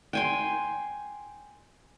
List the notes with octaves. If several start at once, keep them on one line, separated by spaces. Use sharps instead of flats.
G5 G#5 C6